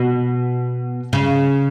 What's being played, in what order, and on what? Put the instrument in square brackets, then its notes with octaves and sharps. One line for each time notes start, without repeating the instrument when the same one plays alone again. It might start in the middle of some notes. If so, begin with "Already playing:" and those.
Already playing: [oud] B2
C#3